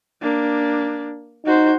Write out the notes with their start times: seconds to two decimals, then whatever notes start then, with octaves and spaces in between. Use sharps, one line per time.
0.22 A#3 D4
1.46 D#4 F#4 C5